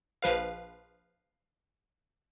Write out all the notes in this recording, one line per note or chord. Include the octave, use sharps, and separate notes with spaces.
A#1 F3 B4 F5